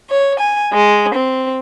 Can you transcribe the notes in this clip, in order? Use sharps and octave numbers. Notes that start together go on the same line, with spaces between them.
C#5
G#5
G#3
C4